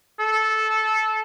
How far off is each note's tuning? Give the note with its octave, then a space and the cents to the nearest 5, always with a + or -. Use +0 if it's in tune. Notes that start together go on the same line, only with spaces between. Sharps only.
A4 -15